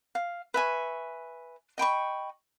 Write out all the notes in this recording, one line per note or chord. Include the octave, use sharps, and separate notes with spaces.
F5
B4 E5 G#5 C#6
D#5 G5 B5 C#6